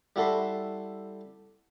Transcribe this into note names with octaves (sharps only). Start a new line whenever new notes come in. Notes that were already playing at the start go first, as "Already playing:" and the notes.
G3 E4 F#4 A4 B5 C6